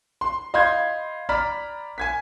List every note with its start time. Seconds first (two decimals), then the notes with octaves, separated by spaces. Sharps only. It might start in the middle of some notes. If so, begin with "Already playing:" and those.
0.21 C6
0.54 D#5 F5 B5 C6 G6 G#6
1.29 D5 A#5 B5 F6 B6
1.98 G#5 G#6 B6